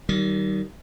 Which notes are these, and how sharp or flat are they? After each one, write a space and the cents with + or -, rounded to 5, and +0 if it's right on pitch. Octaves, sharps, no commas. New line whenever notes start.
D#3 +0 G3 -35